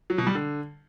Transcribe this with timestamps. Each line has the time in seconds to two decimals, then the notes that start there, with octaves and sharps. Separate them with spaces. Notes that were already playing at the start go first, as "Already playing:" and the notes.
0.10 F#3
0.18 B2
0.27 G3
0.35 D3